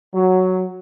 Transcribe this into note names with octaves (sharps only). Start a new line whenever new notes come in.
F#3